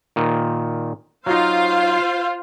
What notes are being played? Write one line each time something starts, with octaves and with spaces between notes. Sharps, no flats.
A#2 D#3
F#3 D#4 F4 C5 F5